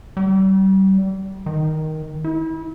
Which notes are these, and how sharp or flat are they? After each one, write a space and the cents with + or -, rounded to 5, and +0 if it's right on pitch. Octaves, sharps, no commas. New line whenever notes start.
G3 -35
D#3 +5
E4 -35